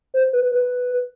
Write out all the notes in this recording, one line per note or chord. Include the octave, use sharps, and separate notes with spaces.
C5
B4
B4